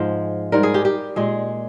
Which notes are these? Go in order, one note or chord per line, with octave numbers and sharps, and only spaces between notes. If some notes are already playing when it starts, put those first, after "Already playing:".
Already playing: G#2 F3 G#3
G#2 G3 A#4
G#4
G4
G4
A#2 G#3 G#4